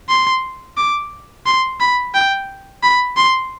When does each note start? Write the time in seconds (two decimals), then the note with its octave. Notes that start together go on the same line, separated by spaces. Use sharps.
0.09 C6
0.77 D6
1.46 C6
1.80 B5
2.14 G5
2.83 B5
3.17 C6